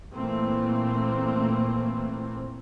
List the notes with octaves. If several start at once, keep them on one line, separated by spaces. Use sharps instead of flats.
A#2 E3 A3 A#3 C4